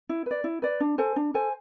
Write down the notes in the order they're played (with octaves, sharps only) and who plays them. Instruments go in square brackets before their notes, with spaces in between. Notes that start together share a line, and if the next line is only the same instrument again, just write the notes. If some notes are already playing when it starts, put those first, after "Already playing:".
[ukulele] E4
B4 D5
E4
B4 D5
D4
A4 C5 G#5
D4
A4 C5 G#5